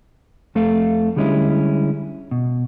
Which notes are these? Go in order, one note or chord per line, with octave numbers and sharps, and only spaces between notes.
F2 A3 A4 F5
D3 G3 G#3 C#4 E4
B2